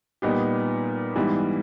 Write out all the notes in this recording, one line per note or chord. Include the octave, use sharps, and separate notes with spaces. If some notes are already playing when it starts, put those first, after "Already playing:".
A#2 G3 B3 D#4 G4
G#2 E3 G3 B3